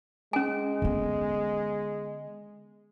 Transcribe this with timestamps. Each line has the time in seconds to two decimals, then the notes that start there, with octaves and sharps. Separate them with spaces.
0.33 G#3 C#4 G#5
0.82 D3 B3